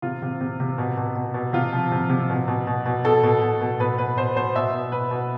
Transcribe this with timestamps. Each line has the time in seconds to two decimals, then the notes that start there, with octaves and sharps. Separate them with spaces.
0.02 C3 F4
0.22 C3
0.41 C3
0.60 C3
0.78 B2
0.97 B2
1.15 B2
1.34 B2
1.53 C3 F4
1.73 F3
1.92 C3
2.10 C3
2.30 B2
2.48 B2
2.67 B2
2.86 B2
3.04 B2 A4
3.23 B2
3.42 B2
3.61 B2
3.80 B2 B4
3.98 B2 B4
4.17 B2 C5
4.36 B2 C5
4.56 B2 E5
4.73 B2
4.92 B2 B4
5.11 B2